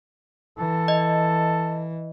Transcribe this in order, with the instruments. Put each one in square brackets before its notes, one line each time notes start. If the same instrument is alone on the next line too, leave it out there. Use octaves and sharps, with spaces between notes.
[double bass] E3 [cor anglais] A4
[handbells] D#5